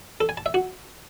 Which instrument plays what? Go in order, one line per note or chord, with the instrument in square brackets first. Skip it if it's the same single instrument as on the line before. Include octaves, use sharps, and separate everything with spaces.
[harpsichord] A4
G#5
A5
E5
F#4